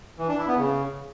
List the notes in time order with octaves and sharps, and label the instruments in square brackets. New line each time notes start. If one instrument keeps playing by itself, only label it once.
[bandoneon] E3
D4
E4
B3
C#3